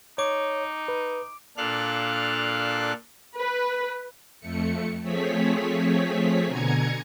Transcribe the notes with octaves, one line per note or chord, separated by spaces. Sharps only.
D#4 C#5 D6 D7
B4
A#2 D4 A4 F5 F6 F#6
B4
F2 A3 C#7
F3 A3 C4 G#4 C#5 B6
B2 D3 G#5 A#5 G#6 C#7